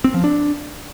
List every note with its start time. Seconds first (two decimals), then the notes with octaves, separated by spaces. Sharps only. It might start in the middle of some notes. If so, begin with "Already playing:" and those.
0.04 C4
0.14 F3
0.24 D4